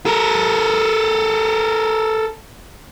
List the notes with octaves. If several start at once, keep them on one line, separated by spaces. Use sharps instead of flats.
A4 A#4